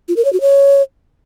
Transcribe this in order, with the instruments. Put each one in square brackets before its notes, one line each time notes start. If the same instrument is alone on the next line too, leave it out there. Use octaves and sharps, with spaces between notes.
[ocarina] F4
A#4
C#5
F#4
C#5